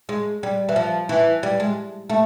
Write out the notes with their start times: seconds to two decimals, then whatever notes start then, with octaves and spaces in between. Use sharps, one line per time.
0.09 G#3
0.43 G3
0.69 E3
0.76 F3
1.09 E3
1.43 G3
1.60 G#3
2.10 A3